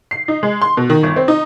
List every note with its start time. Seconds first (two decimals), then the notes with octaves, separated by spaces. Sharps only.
0.11 C7
0.28 D#4
0.43 G#3
0.62 C6
0.77 B2
0.90 D#3
1.03 G1
1.16 C4
1.28 D#4